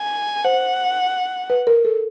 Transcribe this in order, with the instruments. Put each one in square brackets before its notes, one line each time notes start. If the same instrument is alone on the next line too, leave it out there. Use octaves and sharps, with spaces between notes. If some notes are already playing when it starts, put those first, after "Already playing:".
Already playing: [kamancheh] G#5
[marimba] C5 [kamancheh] F#5
[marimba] B4
A#4
A4